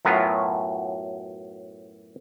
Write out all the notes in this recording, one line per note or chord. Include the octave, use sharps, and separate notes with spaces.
F#2 A2 F#3 B3 F4